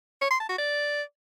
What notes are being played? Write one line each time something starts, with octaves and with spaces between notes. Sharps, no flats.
C#5
C6
A5
F#4
D5